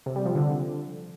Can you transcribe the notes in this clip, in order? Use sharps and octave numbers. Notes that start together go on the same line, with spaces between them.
C3
G3
F3
D3